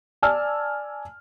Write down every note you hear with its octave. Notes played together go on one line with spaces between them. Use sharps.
D5 G#5 A5 E6 F6